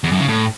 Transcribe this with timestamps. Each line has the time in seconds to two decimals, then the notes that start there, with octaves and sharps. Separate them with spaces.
0.04 E2
0.12 F#2
0.20 C#3
0.28 A2